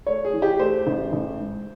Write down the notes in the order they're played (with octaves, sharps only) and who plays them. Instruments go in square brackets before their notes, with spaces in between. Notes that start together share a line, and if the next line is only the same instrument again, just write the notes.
[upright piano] A3 C#5
G#4
E3
G4
A3 C5
A1
A1
G#2